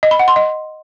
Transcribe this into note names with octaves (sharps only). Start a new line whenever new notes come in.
D#5
B5
F#5
C6
D#5